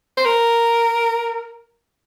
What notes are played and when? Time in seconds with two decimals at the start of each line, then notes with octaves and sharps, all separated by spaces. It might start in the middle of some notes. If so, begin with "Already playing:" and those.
0.17 C5
0.25 A#4